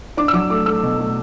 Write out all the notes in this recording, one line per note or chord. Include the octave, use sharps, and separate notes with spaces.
D4 D6
E6
F#3 D6
A3 D6
A3 E6
B2
A3